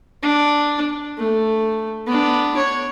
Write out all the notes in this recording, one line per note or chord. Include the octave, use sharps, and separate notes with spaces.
D4
A3
B3 D4
C#5